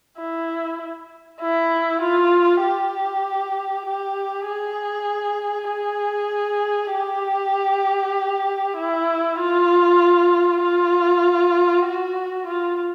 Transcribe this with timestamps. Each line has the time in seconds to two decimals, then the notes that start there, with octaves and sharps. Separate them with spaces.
0.18 E4
1.41 E4
2.02 F4
2.64 G4
3.86 G4
4.48 G#4
5.71 G#4
6.94 G4
8.78 E4
9.40 F4
10.62 F4
11.86 F#4
12.47 F4